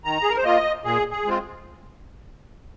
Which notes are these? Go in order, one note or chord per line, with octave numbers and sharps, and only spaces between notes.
D#3 A#5
G#4
A#4
C5
A#3 F4 D#5
A#2 G#4
G#4
G#3 C4 F4